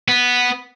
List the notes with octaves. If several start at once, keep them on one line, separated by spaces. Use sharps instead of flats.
B3